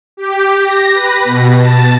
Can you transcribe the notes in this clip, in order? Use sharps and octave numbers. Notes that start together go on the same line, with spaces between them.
G4
A#6
B4
B2
A5